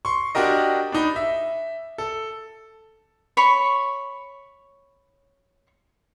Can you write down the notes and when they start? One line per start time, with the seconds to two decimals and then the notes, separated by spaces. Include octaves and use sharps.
0.05 C6 C#6
0.35 D4 F#4 G4 A#4 D#5
0.92 D4 D#4 B5
1.16 E5
1.98 A4
3.37 C#5 B5 C#6